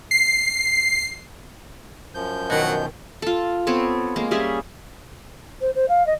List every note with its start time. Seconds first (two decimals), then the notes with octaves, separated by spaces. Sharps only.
0.11 C7
2.15 F#2 F3 G6
2.50 B2 D#3 F#3 F#5
3.22 F4 A4
3.67 B3 C4 A4 C#5
4.16 G#3 A#3
4.31 G3 C#4 G#4 E5
5.61 C5
5.75 C5
5.88 F5
6.06 D#5